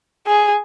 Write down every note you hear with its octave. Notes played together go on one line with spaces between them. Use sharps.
G#4